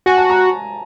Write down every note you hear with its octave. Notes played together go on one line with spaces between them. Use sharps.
F#4 G#5
A5
A#5